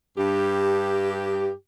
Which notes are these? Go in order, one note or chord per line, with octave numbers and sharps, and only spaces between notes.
G2 G4